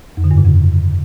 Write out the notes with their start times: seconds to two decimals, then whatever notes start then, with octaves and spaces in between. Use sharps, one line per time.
0.17 F2
0.24 D3
0.31 G2
0.38 C#3
0.44 F2